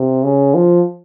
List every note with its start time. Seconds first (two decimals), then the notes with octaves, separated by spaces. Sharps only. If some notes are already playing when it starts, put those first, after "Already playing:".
Already playing: C3
0.23 C#3
0.54 F3